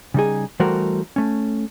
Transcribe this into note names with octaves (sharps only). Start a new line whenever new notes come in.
C#3 G3 D#4 G#4
E3 G3 A3 F#4 A#4 C5
A3 C#4